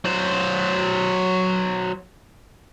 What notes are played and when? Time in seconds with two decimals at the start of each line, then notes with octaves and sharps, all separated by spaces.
0.05 F#3 C5